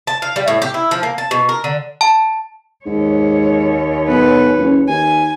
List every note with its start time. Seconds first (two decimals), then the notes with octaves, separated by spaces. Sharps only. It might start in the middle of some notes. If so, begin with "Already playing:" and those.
0.07 A5
0.22 F5
0.36 G3
0.48 A2
0.62 G4
0.74 E4
0.91 F3
1.03 A#3
1.18 A5
1.31 B2
1.49 A#4
1.64 D3
2.01 A5
2.86 D#2 G#2 C#5
4.09 B1 B4
4.59 F#1
4.88 D#2 G#5